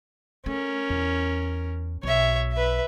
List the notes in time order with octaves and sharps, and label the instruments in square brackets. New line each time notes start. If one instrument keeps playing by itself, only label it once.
[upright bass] A3 [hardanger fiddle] C#4 A#4
[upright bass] E2
[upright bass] B1 [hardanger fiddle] C#5 E5
[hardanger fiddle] B4 E5